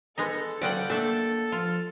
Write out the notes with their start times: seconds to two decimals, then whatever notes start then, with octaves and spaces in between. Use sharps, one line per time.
0.18 G#3 B3 D#4 A4
0.61 C#3 F#3 C4 C#4 D5 F#5 G5
0.90 A3 A#3 D4 A4 E5 A5
1.52 F3 F4